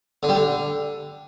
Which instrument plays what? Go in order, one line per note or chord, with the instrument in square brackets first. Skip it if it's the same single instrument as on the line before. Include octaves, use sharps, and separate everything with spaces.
[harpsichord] D3
G3
D3